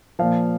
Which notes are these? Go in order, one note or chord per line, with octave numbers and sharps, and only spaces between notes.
A#2 F3 F5